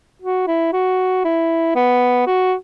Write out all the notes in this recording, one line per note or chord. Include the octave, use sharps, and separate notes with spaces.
F#4
E4
F#4
E4
B3
F#4